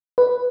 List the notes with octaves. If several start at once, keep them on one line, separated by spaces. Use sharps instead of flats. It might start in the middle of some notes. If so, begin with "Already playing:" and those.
B4